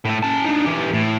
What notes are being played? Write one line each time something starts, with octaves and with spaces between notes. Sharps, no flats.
A2 A3
C#4 A5
D4 D#4
E3 G4
A2